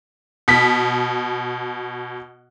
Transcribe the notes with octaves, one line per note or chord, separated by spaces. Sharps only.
B2 B6